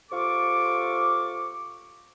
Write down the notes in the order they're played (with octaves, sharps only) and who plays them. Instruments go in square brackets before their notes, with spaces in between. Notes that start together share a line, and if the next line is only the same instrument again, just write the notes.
[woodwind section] C3 F4 A4 C#6 D6